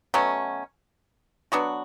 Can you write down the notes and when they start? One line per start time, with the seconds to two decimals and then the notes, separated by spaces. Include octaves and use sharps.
0.14 B2 F#3 A3 C#4
1.52 F#3 B3 D4 F#4